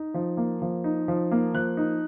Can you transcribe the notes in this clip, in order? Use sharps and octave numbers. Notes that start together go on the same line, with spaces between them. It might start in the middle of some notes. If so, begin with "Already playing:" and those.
Already playing: D#4
F3
A#3
F3
D#4
F3
A#3
F3 F#6
D#4